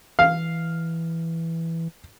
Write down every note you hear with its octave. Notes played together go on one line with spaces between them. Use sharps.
E3 F5